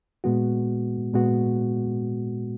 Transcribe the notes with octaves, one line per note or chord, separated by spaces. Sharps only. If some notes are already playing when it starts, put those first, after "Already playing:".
A#2 G#3 B3 F#4
A#2 G#3 B3 F#4